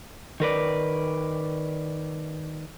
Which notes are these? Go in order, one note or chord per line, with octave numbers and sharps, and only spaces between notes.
D#3 A#4 B4 D5